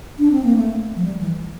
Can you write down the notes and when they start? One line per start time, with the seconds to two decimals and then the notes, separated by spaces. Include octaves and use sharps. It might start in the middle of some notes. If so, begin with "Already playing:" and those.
0.19 D4
0.32 C4
0.44 A#3
0.56 A3
0.96 F3
1.04 G3
1.20 E3